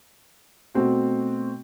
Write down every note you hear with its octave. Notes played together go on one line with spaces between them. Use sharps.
B2 A3 C4 F#4